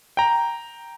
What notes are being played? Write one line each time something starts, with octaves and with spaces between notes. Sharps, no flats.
G5 A#5